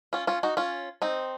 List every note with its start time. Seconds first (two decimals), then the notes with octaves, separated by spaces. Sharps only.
0.13 C#4 F4
0.27 C#4 F4
0.43 D#4 F#4
0.57 C#4 F4
1.02 C4 D#4